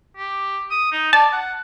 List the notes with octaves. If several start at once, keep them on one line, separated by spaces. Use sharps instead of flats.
G4
D#6
D#4
D5 A5
F#5